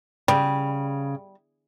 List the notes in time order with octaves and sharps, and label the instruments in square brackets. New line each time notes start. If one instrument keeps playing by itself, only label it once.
[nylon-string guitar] C#3 [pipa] G3